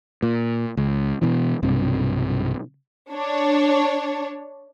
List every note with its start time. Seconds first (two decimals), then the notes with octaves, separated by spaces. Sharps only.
0.23 A#2
0.77 C#2
1.22 B2 E3
1.63 B1 G2 C3
3.12 D4 C#5